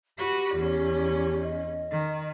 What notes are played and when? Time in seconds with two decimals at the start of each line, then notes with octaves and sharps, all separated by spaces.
0.19 F#4 G4 B4
0.56 E2 C#4
1.43 D#5
1.91 D#3